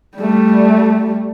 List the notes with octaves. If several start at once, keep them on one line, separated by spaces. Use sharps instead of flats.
G3 A3